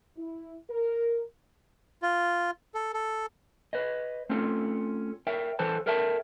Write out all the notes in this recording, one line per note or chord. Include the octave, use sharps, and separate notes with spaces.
E4
A#4
F4
A4
A4
B4 C#5 D#5
A3 C4 C#4 F4 A4
A#4 C#5 E5 G5
E3 A4 B4 C5 A5
A4 A#4 C#5 E5 G5 A5